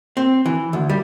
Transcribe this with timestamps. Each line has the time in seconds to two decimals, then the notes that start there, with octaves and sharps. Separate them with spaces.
0.17 C4
0.46 E3
0.73 D2
0.89 G3